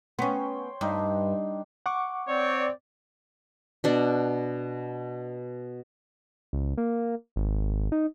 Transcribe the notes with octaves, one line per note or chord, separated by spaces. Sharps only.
B3 C#4 C5 C#5 G5
G2 D4 D#4
F#5 C#6 D6
C4 C#5 D5
B2 D4 F#5
C#2
A#3
G#1
D#4